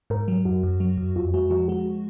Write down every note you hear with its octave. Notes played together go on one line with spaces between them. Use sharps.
G#2 A#4
F#3
F#2 F#4
F#2
F#3
F#2
F2 F4
G#3 F#4
F3 F#4
G#3 F#4